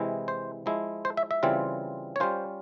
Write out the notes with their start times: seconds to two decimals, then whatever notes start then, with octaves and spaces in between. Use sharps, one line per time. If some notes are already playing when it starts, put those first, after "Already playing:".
Already playing: C3 E3 G#3 E4
0.28 C5
0.66 F3 G#3 E4
1.05 C5
1.17 E5
1.31 E5
1.43 C#3 E3 G3 C4 F4
2.16 C#5
2.20 G3 C#4 F4 C5